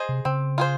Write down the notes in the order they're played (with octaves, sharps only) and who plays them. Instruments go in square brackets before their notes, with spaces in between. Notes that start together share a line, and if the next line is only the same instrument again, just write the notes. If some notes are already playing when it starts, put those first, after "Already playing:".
Already playing: [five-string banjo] G#4 C5 D#5
[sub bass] C3
[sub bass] C#3 [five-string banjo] C4
[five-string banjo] F4 G#4 C5